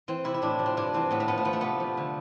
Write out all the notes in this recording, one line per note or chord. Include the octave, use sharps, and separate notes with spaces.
E3 C4
C3 E4
E4
A2 D4
F3
C4
G2 D4
E3 C4
A2 B3
A3
F3 B3
A3
F3 B3
A3
C3 B3
F3
D3